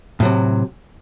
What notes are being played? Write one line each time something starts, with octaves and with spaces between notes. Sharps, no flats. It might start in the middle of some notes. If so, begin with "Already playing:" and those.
A2 C3 F#3